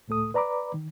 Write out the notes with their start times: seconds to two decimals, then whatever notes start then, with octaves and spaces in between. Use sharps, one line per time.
0.08 C#2 A2 A3 A4 D#6
0.34 B4 D5 A#5 B5 D6
0.74 D#3